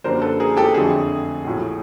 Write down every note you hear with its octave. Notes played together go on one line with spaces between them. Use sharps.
F#2 D3 G3 A#3 D4 A#4 C5
A4 B4
G#4 A#4
G4 A4
F2 D3 F#3 A3 G#4
A#1 A2 F#3